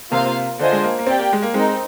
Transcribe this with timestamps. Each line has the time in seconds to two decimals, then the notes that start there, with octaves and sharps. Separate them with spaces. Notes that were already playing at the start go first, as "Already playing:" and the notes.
0.12 C3 A#3 F4 C5 F5
0.59 D3 D4 F4 C5 D#5 G#5
0.72 G#3
0.83 A#3
0.99 A#3
1.07 C4 G4 D5 G5
1.18 A#3
1.33 G#3
1.42 A#3
1.54 G#3 C4 D#4 A#4